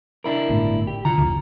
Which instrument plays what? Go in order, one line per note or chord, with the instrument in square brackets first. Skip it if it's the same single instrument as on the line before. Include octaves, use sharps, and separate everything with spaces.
[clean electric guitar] D4 E4 A#4
[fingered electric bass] G1 A2
[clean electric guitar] G4
[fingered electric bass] D3 [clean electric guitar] F4 A#5
[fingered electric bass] F#1 D2